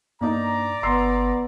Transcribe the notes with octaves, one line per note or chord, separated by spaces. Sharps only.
G2 A#3 D#4 D5 A#5
G1 B3 C6 E6 C7